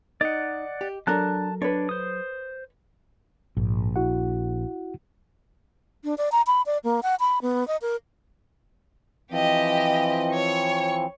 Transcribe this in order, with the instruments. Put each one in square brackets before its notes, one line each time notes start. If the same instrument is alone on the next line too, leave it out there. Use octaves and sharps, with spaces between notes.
[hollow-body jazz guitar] D#4 [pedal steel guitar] D5 F#5 [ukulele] D#5
[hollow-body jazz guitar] G4
[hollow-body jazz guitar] F#3 A4 A#4 [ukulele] D4 A#5 [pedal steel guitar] A5 F#6
[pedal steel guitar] D4 [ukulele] B4 C#5
[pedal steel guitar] C5 D#6
[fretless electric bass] A#1 [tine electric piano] G#2
[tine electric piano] E4 F#4 F#5
[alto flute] D4
D5
A#5
B5
D5
A#3
F#5
B5
B3
D#5
A#4
[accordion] E3 F3 C4 [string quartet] G4 D#5
[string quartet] C#5 C#6